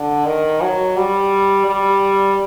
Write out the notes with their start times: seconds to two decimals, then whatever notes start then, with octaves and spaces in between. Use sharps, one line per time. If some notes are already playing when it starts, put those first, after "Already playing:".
Already playing: D3
0.26 D#3
0.61 F#3
0.96 G3
1.66 G3